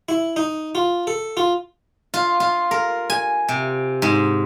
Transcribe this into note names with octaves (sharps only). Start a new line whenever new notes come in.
E4
D#4
F4
A4
F4
F4
F4
A#4
G#5
C3
G#2